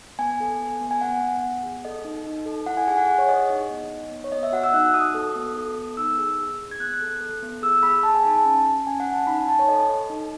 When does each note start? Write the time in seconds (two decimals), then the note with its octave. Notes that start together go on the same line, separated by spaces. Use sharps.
0.19 B3 G#5
0.40 A4
0.60 B3
0.81 B3
0.91 G#5
1.01 B3 F#5
1.22 B3
1.44 B3
1.63 G#4
1.84 A4 D#5
2.05 D#4
2.26 D#4
2.46 A4
2.66 E4 F#5
2.77 G#5
2.88 G#4 G#5
2.98 F#5
3.08 G#4 F#5
3.18 C#5
3.29 G#4 D#5
3.39 D#5
3.49 D#4 D#5
3.70 B3
3.90 D#4
4.11 B3
4.24 C#5
4.32 B3 D#5
4.43 E5
4.52 F#4 F#5
4.63 E6
4.73 D#4 F#6
4.94 F#4 D#6
5.15 A4
5.36 B3
5.56 A4
5.77 B3
5.97 D#4 E6
6.18 G#4
6.38 G#4
6.59 G#4
6.71 G#6
6.80 B3 F#6
7.01 A4
7.21 A4
7.42 B3
7.63 G#4 E6
7.83 G#4 B5
8.03 G#4 A5
8.15 G#5
8.25 D#4 A5
8.45 C#4
8.66 C#4
8.87 C#4 G#5
9.00 F#5
9.07 C#4
9.14 A5
9.27 D#4 B5
9.39 G#5
9.48 D#4 A5
9.59 C#5
9.68 A4 D#5
9.89 A4
10.10 D#4